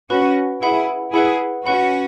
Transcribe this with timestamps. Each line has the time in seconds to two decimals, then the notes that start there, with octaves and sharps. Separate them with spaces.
0.10 C#4 F#4 B4 F#5 B5
0.62 E4 G#4 B4 F#5 B5
1.14 E4 G#4 B4 F#5 B5
1.65 C#4 F#4 B4 F#5 B5